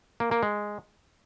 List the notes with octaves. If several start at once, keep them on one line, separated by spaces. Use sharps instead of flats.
A#3
A#3
G#3